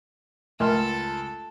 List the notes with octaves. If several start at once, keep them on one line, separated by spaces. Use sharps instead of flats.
C#2 A3 A4 A#4 G#5 C6 F6